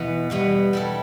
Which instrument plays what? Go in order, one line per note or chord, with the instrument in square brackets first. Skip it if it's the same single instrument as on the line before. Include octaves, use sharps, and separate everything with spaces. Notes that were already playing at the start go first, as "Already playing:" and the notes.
Already playing: [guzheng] E2 B2 B3 [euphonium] E3
[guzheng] E2 B2 B3 [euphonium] G3
[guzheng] G3 E4 A4